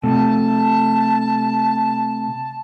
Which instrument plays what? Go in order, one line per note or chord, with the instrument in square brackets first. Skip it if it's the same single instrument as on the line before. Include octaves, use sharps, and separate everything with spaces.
[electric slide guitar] C3 A3 [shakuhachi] A5